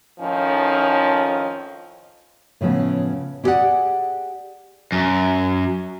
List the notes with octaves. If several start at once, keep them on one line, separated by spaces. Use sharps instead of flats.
F2 A2 D#3 F3 C#4 D#4
A2 C#3 F3 A3 B3
E4 G4 G#4 B4 D5 F#5
F#2